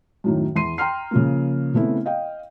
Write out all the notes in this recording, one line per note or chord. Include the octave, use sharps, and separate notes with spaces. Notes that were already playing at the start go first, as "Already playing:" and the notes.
F#2 A2 D#3
E2 E4 C6 C7 D#7
G5 A#5 C6 F6 C7
C#3 F3 A#3
C#3 A3 B3 C4 E4
D#5 F5 G5